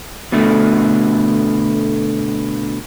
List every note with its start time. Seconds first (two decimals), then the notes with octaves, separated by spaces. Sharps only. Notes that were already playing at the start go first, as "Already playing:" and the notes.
0.32 B2 D3 A3